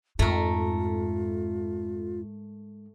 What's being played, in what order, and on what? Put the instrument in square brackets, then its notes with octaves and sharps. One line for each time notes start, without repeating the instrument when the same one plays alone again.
[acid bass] F2 [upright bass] G#2 [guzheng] A3 A#4 [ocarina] F4